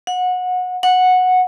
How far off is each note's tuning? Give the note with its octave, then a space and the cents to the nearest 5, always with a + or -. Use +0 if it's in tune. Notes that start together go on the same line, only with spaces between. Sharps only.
F#5 -25
F#5 -10